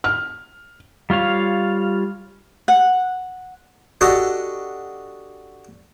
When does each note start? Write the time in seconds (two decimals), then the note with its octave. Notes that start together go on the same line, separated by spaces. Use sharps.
0.04 F6
1.10 G3 F4 C#5 F5
2.68 F#5
4.01 D4 F#4 G4 A4 D#5